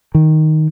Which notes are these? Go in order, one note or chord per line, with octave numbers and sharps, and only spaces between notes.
D#3